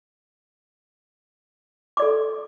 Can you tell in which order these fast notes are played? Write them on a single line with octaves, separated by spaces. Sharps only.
D6 D5 A4